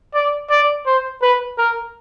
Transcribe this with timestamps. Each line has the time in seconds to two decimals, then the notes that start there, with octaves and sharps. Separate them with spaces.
0.14 D5
0.50 D5
0.86 C5
1.22 B4
1.58 A#4